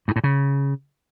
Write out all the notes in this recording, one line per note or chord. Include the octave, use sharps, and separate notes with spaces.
G2
A2
C#3